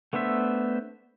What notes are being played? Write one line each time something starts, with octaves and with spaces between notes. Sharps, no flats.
A3 B3 D4 C5 E5